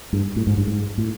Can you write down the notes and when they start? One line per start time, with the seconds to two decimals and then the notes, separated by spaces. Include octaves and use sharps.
0.13 G2
0.36 A2
0.47 G#2
0.58 G2
0.67 G#2
0.98 A2